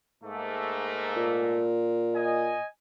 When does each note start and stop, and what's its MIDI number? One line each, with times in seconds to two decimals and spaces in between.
0.23 1.65 44
0.23 1.65 57
0.23 1.65 58
1.17 2.57 46
2.15 2.66 75
2.15 2.66 80